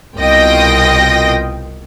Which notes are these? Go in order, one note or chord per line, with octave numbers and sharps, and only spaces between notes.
C2 B2 F4 D#5 G5 A#6